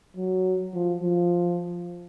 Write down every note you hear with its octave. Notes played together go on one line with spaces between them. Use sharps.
F#3
F3
F3